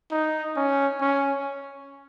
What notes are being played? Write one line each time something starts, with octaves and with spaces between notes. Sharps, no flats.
D#4
C#4
C#4